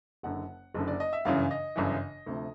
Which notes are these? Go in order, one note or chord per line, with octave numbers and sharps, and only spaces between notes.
F#1 F#2 D3 F#5
F#1 F#2 D3
D5
D#5
E5
G1 F#2 C#3 E3 F5
D#5
G1 F#2 C#3 E3
D2 C3 F3